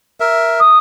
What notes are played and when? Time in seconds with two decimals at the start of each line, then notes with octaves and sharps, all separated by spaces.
0.20 A#4 E5
0.59 D#6